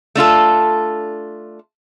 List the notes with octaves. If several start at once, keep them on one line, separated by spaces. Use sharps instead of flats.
A3 D4 F4 A4